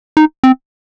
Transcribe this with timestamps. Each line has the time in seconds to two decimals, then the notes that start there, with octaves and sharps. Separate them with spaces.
0.17 D#4
0.44 C4